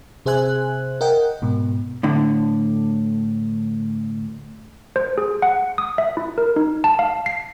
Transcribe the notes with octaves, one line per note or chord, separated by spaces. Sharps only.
C3 G#4 C5 E5 G#5 F#6
A#4 D#5 F#5 G5
G#2 B2
A2 D3
C5
G#4
F#5
D#6
E5
E4
A#4
D#4
A5
F5
C7